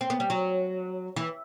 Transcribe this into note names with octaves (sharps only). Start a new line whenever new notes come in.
C4
B3
G3
F#3
E3